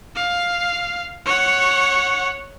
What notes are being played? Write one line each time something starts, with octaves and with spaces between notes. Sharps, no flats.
F5
C#5 F#5